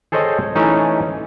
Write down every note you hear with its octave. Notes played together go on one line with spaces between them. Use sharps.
G#4 A4 C5 C#5 D#5 G5
E3 A3 C#4 D#4